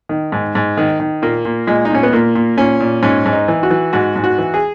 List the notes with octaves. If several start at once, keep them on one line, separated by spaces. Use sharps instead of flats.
D#3
G#2
G#2
D#3
D#3
A#2 A#3
A#2
A#2 G#3
D#4
A#2 C#4
B3
A#2 A#3
A#2
A#2 C#4
A#2
G#2 C#4
G#2
D#4
E3
F#4
E3
G#2 F#4
G#2
F#4
E3
G#4